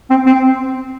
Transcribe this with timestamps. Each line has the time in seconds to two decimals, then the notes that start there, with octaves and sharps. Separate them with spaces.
0.10 C4
0.26 C4